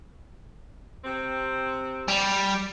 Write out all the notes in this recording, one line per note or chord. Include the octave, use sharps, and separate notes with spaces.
C3 C4
G3